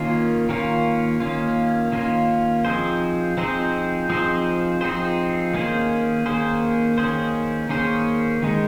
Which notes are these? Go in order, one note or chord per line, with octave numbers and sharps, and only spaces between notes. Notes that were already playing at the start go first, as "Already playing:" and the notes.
Already playing: D#3 A#3 C#4 F4
D#3 A#3 C#4 F4
D#3 A#3 C#4 F4
D#3 A#3 C#4 F4
F3 C4 D#4 G#4 C5
F3 C4 D#4 G#4 C5
F3 C4 D#4 G#4 C5
F3 C4 D#4 G#4 C5
D#3 A#3 C#4 G#4 C5
D#3 A#3 C#4 G#4 C5
D#3 A#3 C#4 G#4 C5
D#3 A#3 C#4 G#4 C5
D#3 G#3 D#4